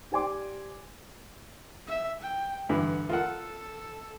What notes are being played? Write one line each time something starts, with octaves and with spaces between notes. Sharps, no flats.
G4 C5 D5 G#5 C6 D6
E5
G5
G2 D3 E3 F#5
F4 A4 A#4 F#5